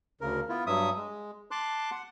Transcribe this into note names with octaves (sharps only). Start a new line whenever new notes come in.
D2 C#3 A#4
B3 E4 F4
G2 F#3 E5 D#6
G#3
A5 C6 D6 F#6
F#5